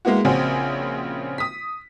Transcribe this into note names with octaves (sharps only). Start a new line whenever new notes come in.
G#3 A#3 B3 E4 F#4
A#1 C#3 C4 F#4 G#5
D#6 B6